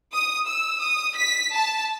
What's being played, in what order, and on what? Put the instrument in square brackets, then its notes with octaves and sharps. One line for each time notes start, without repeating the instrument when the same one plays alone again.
[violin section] D#6
E6
D#6
B6
A5